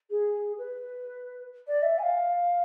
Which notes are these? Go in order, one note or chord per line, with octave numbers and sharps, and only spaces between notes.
G#4
B4
D5
E5
G#5
F5